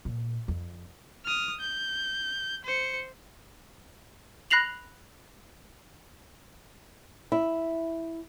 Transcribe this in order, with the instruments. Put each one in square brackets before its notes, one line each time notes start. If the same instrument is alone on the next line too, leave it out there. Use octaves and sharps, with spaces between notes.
[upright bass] A#2
F2
[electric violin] D#6 F6
G6
C5 C#7
[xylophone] B5 F#6 A#6 C7 F7 F#7
[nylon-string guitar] E4